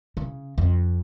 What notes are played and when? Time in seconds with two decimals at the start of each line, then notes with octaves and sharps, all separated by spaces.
0.17 C#3
0.58 F2